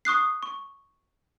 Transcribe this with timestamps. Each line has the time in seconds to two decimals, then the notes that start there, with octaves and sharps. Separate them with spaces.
0.05 C#6 D#6 F#6 C7
0.43 C#6